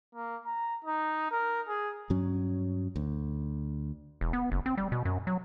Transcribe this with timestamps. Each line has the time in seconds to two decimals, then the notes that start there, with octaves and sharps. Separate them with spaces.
0.15 A#3
0.46 A#5
0.85 D#4
1.31 A#4
1.68 G#4
2.10 G2 F#3 C#4
2.96 D2
4.21 E1
4.33 B3
4.52 F#1
4.66 C4
4.78 G3
4.92 B2
5.05 F#2
5.27 F#3